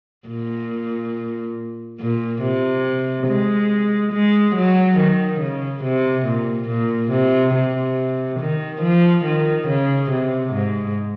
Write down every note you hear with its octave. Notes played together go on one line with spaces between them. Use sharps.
A#2
A#2
C3
G#3
G#3
F#3
D#3
C#3
C3
A#2
A#2
C3
C3
D#3
F3
D#3
C#3
C3
G#2